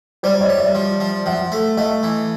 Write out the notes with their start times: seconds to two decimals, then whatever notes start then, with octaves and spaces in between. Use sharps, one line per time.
0.23 G3 C5 D5
0.40 C#5 D#5
0.49 G3
0.58 D5 E5
0.75 F3
1.00 F3
1.26 F3 E5 F#5
1.52 A3
1.77 A3 D#5 F5
2.03 E3